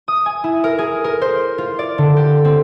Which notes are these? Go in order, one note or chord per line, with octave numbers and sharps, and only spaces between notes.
D#6
G#5
E4
A#4
G#4
A#4
C5
F4
D5
D3
G4
C4